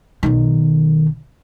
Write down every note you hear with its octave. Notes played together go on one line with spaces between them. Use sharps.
B1 D#3